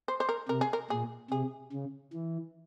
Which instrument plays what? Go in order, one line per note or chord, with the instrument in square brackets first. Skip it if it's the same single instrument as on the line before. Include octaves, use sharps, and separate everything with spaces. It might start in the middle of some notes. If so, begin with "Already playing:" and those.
[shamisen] C5
C5
A#4
[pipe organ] C3 [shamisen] A#4
[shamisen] G#4
A#4
[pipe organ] A#2 [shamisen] G#4
[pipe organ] C3 [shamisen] G#4
[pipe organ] C#3
E3